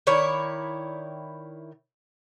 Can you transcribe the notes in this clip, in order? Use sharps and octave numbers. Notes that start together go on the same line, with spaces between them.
D#3 E4 C#5 D5